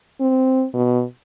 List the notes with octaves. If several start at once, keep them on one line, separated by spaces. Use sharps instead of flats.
C4
B2